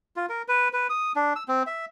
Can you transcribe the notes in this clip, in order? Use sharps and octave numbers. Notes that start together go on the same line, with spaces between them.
F4
A#4
B4
B4
D#6
D4
E6
C4
E5